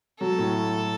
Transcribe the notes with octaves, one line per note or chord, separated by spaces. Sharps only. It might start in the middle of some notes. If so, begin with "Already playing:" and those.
F#3 A4
A2